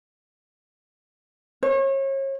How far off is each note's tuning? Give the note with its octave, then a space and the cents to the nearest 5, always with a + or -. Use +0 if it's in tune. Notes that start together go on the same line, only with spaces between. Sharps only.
C#5 -35